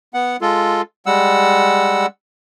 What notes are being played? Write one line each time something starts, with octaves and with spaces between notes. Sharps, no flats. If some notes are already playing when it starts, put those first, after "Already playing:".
B3 F#5
G#3 F4 A4
G3 G#3 F#5 E6